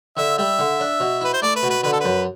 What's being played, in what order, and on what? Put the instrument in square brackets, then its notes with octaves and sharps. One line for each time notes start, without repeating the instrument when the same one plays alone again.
[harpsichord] D3 [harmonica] E5
[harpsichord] G3 [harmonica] E5
[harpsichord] D3
D4
B2
[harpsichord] E4 [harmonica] B4
[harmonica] C5
[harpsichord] A3 [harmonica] D5
[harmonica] B4
[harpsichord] B2
[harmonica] B4
[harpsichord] D3 [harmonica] B4
[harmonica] A4
[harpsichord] F#2 [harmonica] B4